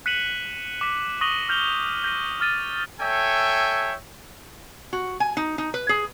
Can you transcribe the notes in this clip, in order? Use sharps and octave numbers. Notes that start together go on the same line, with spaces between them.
F#6 B6 C#7 D#7 E7 F#7
D6 B6
C#6 D#6 A#6 D#7 F#7 G7
F6 G6 F7 G7
G6 A#6 D#7
D6 F6 A6 D#7
A4 C#5 E5 G5 G#5
F#4
G#5
D#4
D#4
B4
G#4